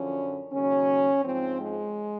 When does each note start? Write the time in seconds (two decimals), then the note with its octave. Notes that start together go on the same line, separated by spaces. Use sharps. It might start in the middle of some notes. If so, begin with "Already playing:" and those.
Already playing: F#2 D3 F3 C#4
0.53 D#2 C#3 F#3 C#4
1.25 G#2 F3 C4
1.61 G#3